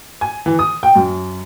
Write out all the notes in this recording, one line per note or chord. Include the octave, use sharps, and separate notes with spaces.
G#5
E3
D#6
G5
F#2